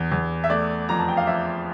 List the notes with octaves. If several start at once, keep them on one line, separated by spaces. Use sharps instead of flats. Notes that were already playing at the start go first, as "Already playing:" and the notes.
Already playing: E2
E2
E5
A3 D5
F2 A#5
A5
G5
F5
F3 E5